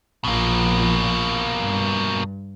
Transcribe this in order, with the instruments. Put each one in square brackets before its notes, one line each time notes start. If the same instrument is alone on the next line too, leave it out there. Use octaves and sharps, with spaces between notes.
[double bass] A#1 F3 [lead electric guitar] B2 A#3
[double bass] G2